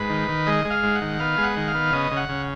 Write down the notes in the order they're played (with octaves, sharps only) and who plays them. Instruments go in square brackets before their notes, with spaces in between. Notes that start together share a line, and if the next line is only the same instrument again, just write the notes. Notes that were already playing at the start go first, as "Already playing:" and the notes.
Already playing: [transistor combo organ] G#2 B4
D#3
D#3
G#3 D#5
G#3
F5
G#2
F#5
D#3
B3 F5
G#3
F#5
D#3
F5
B3
C#3 D#5
C#3
F#5
C#3